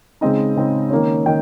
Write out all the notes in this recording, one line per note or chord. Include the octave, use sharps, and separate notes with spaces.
C#3 G#3 C4 D#4 D#5
C#3 G#3 C4 D#4
D#3 A#3 C#4
D#3 G5